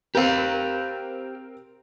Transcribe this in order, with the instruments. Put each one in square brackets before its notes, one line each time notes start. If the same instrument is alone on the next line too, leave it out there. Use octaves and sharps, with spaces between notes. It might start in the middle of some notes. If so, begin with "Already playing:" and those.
[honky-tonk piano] C4 A#4 [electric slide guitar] G4 F5